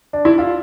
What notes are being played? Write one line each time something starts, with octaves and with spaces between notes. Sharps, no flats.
D4
E4
F4